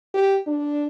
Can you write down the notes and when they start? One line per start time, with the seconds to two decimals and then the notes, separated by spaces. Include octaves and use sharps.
0.14 G4
0.47 D4